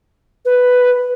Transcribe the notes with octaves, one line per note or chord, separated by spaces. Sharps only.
B4